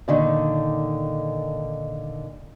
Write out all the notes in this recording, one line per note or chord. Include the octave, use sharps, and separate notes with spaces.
A#2 D3 D#3